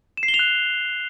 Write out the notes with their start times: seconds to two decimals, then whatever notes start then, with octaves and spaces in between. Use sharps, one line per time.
0.17 E7
0.23 C7
0.28 G7
0.34 F7
0.39 F#6